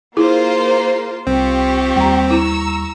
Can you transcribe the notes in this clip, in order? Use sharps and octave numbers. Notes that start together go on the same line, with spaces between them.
A#3 E4 F4 G#4 C5
C2 C4 F4 G4 C#6
D#2 G3 G5 A#5
E4 A#5 C#6 E6